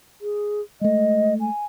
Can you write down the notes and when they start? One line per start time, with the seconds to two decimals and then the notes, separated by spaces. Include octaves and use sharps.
0.21 G#4
0.81 G#3 A3 D#5
1.40 G#5